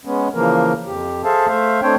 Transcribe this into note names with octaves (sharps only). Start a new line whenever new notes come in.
G#3 B3 C#4
C#3 E3 F3 A#3 A#4
F2 G4
G#4 A4 C5 E5 F5 A5
A3 C5 E5 F5
A3 C4 D4 C5 C#5 G5